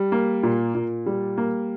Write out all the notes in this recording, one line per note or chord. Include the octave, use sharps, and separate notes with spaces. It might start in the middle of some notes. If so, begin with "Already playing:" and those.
Already playing: G3
A#3
A#2
A#2
G3
A#3